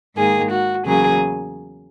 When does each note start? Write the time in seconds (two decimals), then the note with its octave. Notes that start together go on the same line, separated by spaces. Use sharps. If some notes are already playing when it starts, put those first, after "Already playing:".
0.17 G#2 D#3 A#3 G#4
0.51 F#4
0.85 E2 C#3 F#3 A#3 G#4